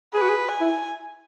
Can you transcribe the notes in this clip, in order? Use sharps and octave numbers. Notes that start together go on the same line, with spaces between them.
G#4 B4
F#4
G#4
G#5
E4